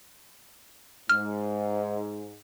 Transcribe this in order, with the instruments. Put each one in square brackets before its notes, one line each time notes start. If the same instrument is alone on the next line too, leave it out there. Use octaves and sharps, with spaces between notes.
[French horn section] G#2 [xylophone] F6